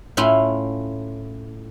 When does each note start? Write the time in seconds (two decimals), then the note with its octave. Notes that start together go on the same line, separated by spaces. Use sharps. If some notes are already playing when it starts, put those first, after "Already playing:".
0.17 A2 C#4 E4 F4 F5